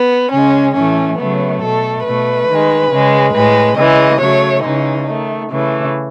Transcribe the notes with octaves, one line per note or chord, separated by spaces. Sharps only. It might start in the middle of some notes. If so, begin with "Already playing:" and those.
Already playing: B3
C#3 G#3 C#4
A2 E3 A3 C#4
C#3 F#3 A3 B3
B2 A3 A4
B2 A3 B4
D#3 G#3
C#3 G#3
A2 G#3 B4
C#3 E3 G#3 D#5
C#3 F#3 A3 C#5
C#3 E3 G#3 D#4
D#3 A3
C#3 E3 A3